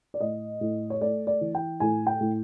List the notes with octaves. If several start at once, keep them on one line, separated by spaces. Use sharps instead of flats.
D5
A2 D#5
A2
C#5
A3 D5
D5
E3
G5
A2 G#5
G5
A2